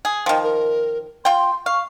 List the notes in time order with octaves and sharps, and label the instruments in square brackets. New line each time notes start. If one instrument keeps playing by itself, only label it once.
[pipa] G#4
[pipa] D#3 F3 [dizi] G5
[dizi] A#4
[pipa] F4 G5 [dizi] C6
[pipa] F5 [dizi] C#6